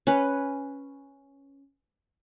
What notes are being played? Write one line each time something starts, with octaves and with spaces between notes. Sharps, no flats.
C#4 B4